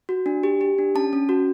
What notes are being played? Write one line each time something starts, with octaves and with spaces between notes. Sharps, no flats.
F#4
D4
G4
G4
D4
C#4 A5
C#4
F#4